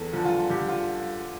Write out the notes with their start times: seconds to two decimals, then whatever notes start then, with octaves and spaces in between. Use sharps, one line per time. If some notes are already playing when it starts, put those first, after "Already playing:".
Already playing: E2 A4
0.13 D3 F3
0.25 F4
0.50 D3 G4
0.68 F4